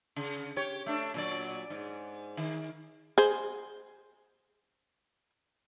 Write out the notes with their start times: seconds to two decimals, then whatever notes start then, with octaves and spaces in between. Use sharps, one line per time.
0.16 C#3
0.56 G4 C#5
0.86 A3 D4
1.14 A#2 F#3 D5
1.70 G#2
2.37 D#3
3.18 G#4 C5